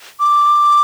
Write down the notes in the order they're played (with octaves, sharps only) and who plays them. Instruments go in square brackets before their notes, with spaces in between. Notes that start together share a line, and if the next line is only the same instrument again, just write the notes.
[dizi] D6